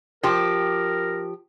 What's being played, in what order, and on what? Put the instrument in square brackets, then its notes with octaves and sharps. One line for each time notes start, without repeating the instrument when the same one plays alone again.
[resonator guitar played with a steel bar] F3 G4 [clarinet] A#4